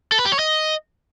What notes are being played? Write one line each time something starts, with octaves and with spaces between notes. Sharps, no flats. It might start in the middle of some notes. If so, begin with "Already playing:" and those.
A4
B4
G4
C#5
D#5